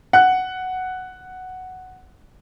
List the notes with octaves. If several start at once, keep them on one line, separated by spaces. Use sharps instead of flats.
F#5 F#6